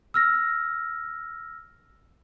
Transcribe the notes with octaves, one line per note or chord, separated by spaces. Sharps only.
E6 F6 A#6